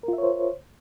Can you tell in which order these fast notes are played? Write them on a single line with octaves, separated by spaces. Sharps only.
A#4 F4 E5 C#5 C5